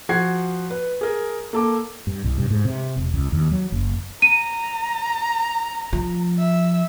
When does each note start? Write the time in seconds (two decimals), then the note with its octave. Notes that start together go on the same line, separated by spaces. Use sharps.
0.09 F3 F#4 F#5 G#6 C7
0.70 B4
1.01 G#4 A#4
1.53 A#3 A4 D6
2.07 G2
2.24 C2
2.38 G2
2.51 G#2
2.65 C3
2.97 E1
3.14 C#2
3.32 D#2
3.51 F#3
3.72 F#1
4.22 A#5 D#7
5.93 F3
6.38 E5